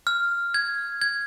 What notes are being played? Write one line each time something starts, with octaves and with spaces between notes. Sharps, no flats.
F6
G#6
G#6